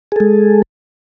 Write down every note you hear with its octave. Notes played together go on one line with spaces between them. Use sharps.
G#3 G#4 A4